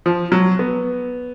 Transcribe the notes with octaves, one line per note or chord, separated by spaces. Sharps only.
F3
F#3
B3